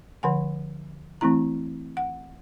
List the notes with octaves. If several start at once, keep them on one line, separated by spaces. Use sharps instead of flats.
D3 F3 F#5 G#5
E3 A3 C4 E4 A#5
F#5